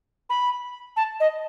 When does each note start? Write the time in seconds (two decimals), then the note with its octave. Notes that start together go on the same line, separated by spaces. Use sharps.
0.29 B5
0.96 A5
1.20 D#5